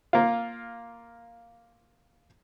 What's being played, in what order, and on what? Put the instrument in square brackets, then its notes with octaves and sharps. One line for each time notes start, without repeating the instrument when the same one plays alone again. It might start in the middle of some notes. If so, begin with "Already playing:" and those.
[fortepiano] A#3 F4